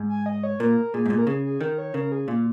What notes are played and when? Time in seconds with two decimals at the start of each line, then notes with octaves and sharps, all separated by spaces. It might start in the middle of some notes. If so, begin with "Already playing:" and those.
Already playing: G#2
0.09 G#5
0.26 D#5
0.43 C#5
0.60 A#2 A#4
0.94 A#2 G#4
1.06 G#2
1.10 A#2
1.18 A#4
1.27 C#3 G#4
1.45 G#4
1.61 D#3 A#4
1.78 C#5
1.94 C#3 A#4
2.12 G#4
2.28 A#2 F4